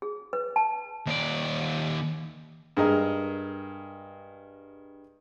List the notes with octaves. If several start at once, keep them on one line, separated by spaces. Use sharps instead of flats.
G#4
B4
A5
D#2 D5
G2 G#3 G#4 A#4 D#5